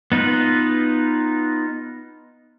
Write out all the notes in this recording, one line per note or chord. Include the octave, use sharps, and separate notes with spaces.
B3 D#4 F4 B4